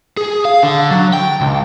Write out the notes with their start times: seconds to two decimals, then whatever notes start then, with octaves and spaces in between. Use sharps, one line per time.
0.17 G#4
0.45 F5
0.63 D3
0.91 F#3
1.13 G5
1.41 C#2